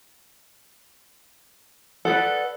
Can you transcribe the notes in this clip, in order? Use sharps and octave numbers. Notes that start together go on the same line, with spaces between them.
A4 B4 D5 F#5